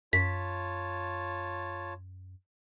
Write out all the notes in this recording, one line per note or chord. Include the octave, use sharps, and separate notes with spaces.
F#2 F4 C#5 A5 B6